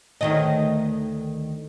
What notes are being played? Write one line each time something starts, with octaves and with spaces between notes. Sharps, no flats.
D2 D#3 D#5